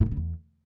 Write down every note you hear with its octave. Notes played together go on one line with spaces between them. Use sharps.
A2
B2
C#3
E2